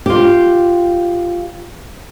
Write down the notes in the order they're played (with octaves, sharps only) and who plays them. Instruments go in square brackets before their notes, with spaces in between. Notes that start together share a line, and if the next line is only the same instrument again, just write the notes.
[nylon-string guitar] F4 G4